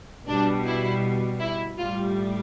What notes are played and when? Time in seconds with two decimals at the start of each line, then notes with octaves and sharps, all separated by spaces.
0.27 B2 G3 D4
0.65 E4
1.40 E4
1.77 A2 G3 F4